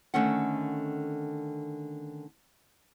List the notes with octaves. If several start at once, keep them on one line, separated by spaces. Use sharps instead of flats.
D3 D#3 A3 C#4 F#5